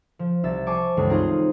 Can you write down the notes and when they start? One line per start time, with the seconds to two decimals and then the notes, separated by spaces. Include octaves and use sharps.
0.19 F3
0.44 C2 E5 A6
0.66 C5 G#5 A5 C#6 D6
0.97 C#2 G2 E3 G#3 A3
1.09 C4 D#4 F4 G#4